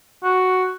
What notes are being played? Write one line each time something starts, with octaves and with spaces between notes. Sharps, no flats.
F#4